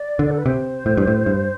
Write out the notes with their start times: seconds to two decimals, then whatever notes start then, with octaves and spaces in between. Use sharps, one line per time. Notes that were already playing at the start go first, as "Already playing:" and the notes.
Already playing: D5
0.19 D3
0.31 A4
0.38 B4
0.46 C3 C5
0.86 A2
0.97 G2
1.07 A2
1.26 G2